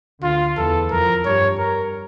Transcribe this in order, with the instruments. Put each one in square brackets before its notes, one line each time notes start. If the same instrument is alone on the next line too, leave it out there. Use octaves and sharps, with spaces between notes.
[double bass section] D2 D3 [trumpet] F4
[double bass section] E2 E3 [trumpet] A4
[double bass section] F2 F3 [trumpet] A#4
[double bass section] G2 G3 [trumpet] C#5
[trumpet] A#4